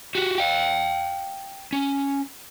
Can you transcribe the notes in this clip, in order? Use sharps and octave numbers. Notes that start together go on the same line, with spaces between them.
F#4 G4
F5 G5
C#4